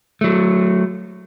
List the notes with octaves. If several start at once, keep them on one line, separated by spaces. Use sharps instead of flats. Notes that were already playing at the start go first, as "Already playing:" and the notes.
F#3 A3